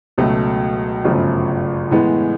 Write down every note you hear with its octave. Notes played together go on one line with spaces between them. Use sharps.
C#2 B2 F#3 A3
G1 F#2 C#3 F3 A3
A2 E3 G#3 B3